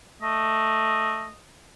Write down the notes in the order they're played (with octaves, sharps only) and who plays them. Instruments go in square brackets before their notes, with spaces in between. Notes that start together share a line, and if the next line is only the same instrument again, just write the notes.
[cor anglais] A3 [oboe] D#5